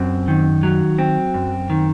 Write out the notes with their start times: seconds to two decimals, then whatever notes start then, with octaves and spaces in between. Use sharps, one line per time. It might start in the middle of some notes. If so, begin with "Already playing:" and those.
Already playing: F#2 C4
0.28 D#3
0.63 F#3
0.99 C4
1.34 F#2
1.70 D#3